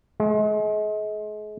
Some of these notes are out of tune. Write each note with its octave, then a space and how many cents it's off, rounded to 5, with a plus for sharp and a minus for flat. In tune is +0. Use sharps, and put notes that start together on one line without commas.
G#3 +35